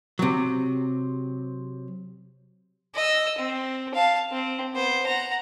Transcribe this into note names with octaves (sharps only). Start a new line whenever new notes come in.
C3 F#3
D#5 E6
C4
F5 A5
C4
B3 C5
F#5 A#5